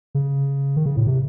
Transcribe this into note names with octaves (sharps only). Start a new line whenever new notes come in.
C#3
D#3
C#3
A2
C3